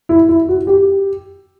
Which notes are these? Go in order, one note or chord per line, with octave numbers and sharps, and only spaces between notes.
E4
E4
F#4
G4